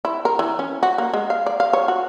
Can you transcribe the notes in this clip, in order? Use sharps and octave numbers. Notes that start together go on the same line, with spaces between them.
E4
A#4
E3
C#4
F#4
A#3
G#3
F5
D5
F5
C#5
F#4